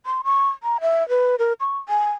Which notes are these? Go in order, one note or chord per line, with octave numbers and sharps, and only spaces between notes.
C6
C#6
A#5
E5
B4
A#4
C#6
G#5